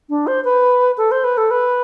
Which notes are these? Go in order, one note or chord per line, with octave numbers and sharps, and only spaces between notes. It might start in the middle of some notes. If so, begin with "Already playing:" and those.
D4
C5
B4
A4
C5
B4
A4
B4